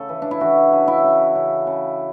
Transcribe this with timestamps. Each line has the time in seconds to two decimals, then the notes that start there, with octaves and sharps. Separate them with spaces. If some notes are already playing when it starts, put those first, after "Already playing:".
Already playing: C#3 A4
0.09 E3
0.22 D4
0.31 E4
0.41 E3 F#4
0.72 C#3
0.88 E4
1.04 C#3
1.35 C#3
1.67 C#3